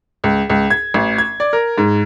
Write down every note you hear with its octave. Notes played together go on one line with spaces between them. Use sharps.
C#2
C#2
G#6
A1
G#6
D5
A#4
G#2